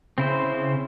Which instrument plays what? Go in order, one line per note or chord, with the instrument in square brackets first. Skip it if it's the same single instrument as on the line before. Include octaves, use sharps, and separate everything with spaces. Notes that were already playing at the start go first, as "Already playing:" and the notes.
[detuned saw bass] C#3 [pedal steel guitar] C4 E4 C5